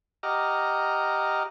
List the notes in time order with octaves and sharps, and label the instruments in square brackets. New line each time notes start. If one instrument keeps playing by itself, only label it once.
[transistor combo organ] G4 D#5 F#5 A#5 D6 F6